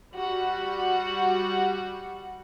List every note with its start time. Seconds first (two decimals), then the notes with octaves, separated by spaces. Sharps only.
0.14 G3 F#4